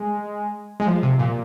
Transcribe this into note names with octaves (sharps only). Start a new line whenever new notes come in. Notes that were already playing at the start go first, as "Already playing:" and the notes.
Already playing: G#3
G#3
F3
C3
A#2